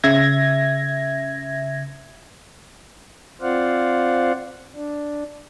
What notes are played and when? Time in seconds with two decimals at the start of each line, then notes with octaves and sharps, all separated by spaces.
0.04 C#3 E5 G#6 A#6
3.41 C4 F4 C5 D5 F5 F#5
4.75 D4